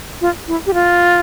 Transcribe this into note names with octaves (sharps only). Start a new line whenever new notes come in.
F4
E4
G4
F4